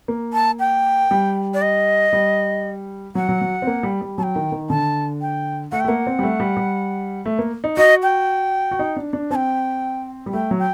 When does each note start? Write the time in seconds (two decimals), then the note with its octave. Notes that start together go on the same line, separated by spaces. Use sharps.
0.08 A#3
0.33 A5
0.59 G5
1.11 G3
1.54 D5
1.62 D#5
2.13 G3
3.15 F#3 F#5
3.29 F#3
3.41 F#3
3.62 C4
3.67 A#3
3.83 G3
4.01 G3
4.18 F#3 A5
4.23 G5
4.36 D#3
4.52 D#3
4.69 D3 A5
5.21 G5
5.72 A3 F#5
5.80 G5
5.84 A3
5.88 A#3 F#5
6.07 C4
6.19 G3
6.23 A3
6.40 G3
6.57 G3
7.26 A3
7.39 A#3
7.64 D#4
7.77 F#4 D#5
8.03 G5
8.71 F#4
8.79 D#4
8.96 D4
9.13 D4
9.31 C4 A5
9.35 G5
10.26 G3
10.33 A3 G5
10.51 F#3
10.59 G5